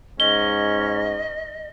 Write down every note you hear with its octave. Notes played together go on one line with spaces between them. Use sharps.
G#2 C#4 D#5 G7